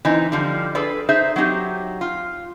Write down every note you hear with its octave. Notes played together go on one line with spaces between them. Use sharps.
E3 C4 D#4
D3 F3 G3
G#4 A4 B4 D5
D#4 G#4 C5 E5
F#3 C4 D#4 G4
F4